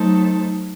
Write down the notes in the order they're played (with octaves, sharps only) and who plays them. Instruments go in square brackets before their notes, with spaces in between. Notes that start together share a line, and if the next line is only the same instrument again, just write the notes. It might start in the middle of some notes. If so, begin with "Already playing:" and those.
Already playing: [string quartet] F#3 A3 D#4 A4 C5